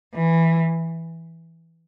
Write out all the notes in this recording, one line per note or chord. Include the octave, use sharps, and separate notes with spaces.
E3